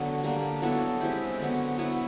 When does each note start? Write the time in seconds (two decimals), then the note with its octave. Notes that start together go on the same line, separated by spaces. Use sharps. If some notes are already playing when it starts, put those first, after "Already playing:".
Already playing: D3 F#3 B3
0.23 G3 A#3 D4
0.62 F#3 B3 E4 A4
1.01 G#3 C4 E4 G4
1.39 D3 F#3 B3
1.78 F#3 B3 E4